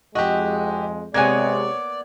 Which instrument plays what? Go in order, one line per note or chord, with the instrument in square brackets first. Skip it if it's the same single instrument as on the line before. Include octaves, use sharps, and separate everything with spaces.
[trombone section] F2 G#3 [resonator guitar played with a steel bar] F#4 [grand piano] G4 D#5
[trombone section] C3 G#3 [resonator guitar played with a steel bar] A#3 B3 G#5 [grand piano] C#5 G#6 [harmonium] D5